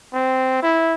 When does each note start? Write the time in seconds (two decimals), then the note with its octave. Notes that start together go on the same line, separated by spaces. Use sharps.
0.13 C4
0.62 E4